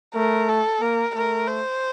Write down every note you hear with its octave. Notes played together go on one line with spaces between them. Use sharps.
A3 A#4
A4
A#3 A#4
A3 A#4
C5